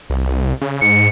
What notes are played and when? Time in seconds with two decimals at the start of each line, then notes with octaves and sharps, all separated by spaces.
0.10 C2
0.61 C#3
0.81 G#2 C#7